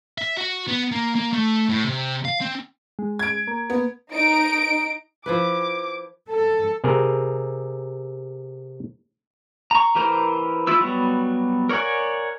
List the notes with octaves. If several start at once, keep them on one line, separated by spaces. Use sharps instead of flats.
E5
F#4
B3
A#3
A#3
A3
A2
C3
F5
C4
G#3
G#6 D7
A#3
B3
D#4 D7
F3 E4 B4 D6
A4
C3 G#4 A#4
A#5 C#6
E3 G4 A#4 C5 A#5
E4 F4 E6
F#3 G3 B3 F#4
A#4 C#5 D5 F#5 G#5